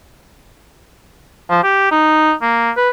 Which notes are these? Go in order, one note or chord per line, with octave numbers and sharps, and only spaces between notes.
F3
G4
D#4
A#3
B4